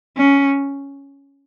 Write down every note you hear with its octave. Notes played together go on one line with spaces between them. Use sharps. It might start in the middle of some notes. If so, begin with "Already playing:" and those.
C#4